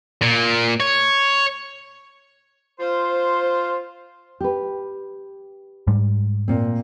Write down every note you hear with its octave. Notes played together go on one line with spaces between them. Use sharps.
A#2
C#5
F4 C5
G4 B4
G#2 G3
A#2 C4